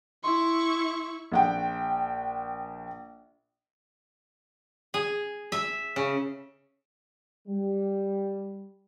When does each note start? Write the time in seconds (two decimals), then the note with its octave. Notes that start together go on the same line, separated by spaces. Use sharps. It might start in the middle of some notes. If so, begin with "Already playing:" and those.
0.24 E4 C6 C#6
1.32 A#1 F#5 G5
4.94 G#4
5.52 E5
5.96 C#3
7.47 G3